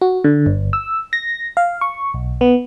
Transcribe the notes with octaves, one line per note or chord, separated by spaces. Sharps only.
F#4
D3
G1
E6
A#6
F5
C#6
B1
B3